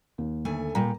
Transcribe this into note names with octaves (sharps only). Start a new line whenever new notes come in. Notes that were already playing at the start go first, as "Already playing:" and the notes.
D#2
D2 A3 G#5
A#2 G3 A#5